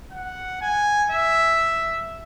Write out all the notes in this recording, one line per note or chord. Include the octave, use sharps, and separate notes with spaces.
F#5
G#5
E5